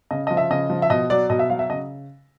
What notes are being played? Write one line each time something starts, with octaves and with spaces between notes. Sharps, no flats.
C#3 D#5
F3 D#5
E5
C#3 D#5
F3
E5
B2 D#5
F#3 D5
B2 D#5
E5
F#3 F5
E5
C#3 D#5